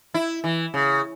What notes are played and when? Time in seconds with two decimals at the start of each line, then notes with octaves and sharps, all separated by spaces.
0.14 E4
0.44 E3
0.74 C#3